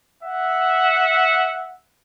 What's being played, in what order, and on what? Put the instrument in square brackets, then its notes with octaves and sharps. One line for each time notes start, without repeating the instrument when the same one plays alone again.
[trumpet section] E5 F#5